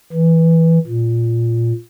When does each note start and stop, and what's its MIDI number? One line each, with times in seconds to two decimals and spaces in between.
0.13 0.79 52
0.87 1.72 46